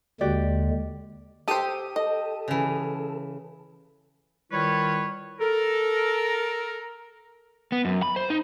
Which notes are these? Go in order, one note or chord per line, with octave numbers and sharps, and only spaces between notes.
D#2 D3 G#3 F#4 G4 D5
G4 A4 C5 G5 D#6 D#7
A4 D#5 A5
C#3 E3
D#3 G3 E4 F4 B4 C#5
A4 A#4
B3
F#2
B5
C5
D#4